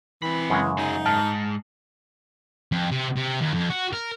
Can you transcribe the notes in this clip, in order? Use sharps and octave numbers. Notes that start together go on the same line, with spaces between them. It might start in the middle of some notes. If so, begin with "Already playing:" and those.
E3 C4 B5
F#2 C#3 G#3
F#3 D#4 G#4
G#2 A5 F6
F2
C3
C3
D#2
F2
F#4
A#4